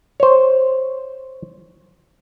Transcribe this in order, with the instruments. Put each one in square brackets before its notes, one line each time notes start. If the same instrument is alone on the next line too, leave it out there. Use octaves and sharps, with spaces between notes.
[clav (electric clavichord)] C5 C#5